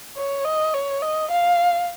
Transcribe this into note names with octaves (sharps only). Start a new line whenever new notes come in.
C#5
D#5
C#5
D#5
F5